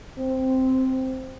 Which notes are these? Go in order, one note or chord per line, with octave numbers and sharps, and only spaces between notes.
C4